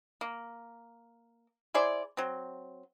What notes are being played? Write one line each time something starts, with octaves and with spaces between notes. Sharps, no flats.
A#3
E4 G#4 C5 D5
F#3 C4